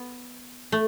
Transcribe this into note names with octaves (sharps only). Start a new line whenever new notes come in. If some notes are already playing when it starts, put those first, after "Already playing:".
Already playing: B3
A3